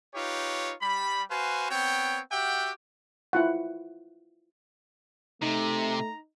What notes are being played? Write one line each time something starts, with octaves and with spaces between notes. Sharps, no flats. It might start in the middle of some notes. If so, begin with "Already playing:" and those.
D#4 F4 G4 B4 C#5
G3 B5
F#4 B4 C5 F5 G#5
B3 C4 C#5 G5
F#4 G4 E5 F#5 G5
E4 F4 F#5
C3 A3 D#4 A#5